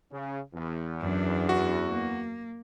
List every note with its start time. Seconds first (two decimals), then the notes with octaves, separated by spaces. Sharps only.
0.12 C#3
0.55 E2
1.01 F#2 D4
1.49 F#4
1.88 A#3